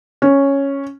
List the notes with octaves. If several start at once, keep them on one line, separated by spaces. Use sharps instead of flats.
C#4